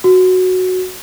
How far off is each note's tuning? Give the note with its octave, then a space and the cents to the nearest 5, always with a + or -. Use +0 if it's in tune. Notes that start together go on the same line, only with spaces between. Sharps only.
F#4 -5